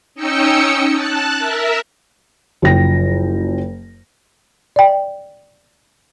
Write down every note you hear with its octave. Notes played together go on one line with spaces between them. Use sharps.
C#4 D#4 D#5 G5 E6 C#7
A5 F#6
A#4 E5
F#1 F#2 F3 G5 A#6
D5 G5